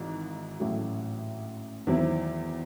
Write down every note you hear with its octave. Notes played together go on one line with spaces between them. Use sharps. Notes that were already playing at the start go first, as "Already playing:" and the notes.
Already playing: G#1 G#2 E3
A1 A2 F#3 A3
E2 D#3 F#3 C4 E4